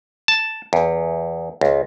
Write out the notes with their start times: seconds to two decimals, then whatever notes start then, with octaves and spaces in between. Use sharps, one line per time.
0.28 A5
0.73 E2
1.61 C#2